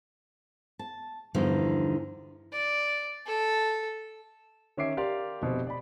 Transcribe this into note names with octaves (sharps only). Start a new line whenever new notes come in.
A5
E2 G2 D3 F3 D#4
D5
A4
D#3 C#4 E5 D6 C7 D7
G4 A#4 D5 F5 C6
F1 B2 C4
D5 B5